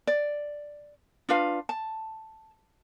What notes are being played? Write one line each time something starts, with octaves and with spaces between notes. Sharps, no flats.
D5
D4 F4 B4 F5
A5